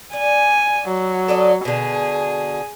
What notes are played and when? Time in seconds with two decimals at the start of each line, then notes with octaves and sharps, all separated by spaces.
0.13 D5 G#5
0.88 F#3
1.28 A4 D5 D#5
1.65 B2 D3 G#4